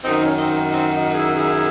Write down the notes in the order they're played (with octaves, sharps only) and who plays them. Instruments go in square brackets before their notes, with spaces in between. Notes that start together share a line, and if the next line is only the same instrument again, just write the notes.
[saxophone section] F#2 D#3 C4 D#4
C#4
C4 D#4
C4 D#4
D#4 F#4
E4 G#4
E4 G#4